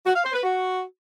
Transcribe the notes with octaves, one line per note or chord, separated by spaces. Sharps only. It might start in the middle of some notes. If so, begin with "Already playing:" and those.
F#4
F5
C5
B4
F#4